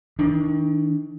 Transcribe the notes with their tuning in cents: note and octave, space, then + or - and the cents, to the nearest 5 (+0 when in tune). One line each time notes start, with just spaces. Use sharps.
D#3 +35 D4 +0